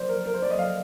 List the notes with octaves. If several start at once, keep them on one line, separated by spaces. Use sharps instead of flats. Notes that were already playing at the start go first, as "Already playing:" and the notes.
Already playing: C5 D5
A#4
A#4
C5
D5
D#5
F5